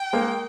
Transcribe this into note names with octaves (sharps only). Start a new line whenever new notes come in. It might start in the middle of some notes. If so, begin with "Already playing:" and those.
Already playing: G5
G#3 A#3